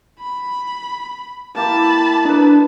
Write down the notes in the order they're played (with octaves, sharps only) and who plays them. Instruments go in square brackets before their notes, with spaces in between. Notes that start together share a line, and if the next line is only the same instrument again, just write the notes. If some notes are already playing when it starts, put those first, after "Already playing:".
[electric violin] B5
[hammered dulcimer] A#3 E4 G4 [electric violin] A5 B5
[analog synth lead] D4 [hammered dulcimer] D#4 A4 B4